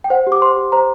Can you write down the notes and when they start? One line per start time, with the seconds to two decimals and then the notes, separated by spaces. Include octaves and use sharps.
0.04 G5
0.10 C5 F#5
0.27 G4
0.32 D6
0.42 C5 C6
0.57 G4
0.72 C5 A#5